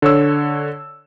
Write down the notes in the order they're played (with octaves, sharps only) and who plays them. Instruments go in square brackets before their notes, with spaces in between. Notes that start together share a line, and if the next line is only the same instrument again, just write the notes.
[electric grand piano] D3 C#5 E6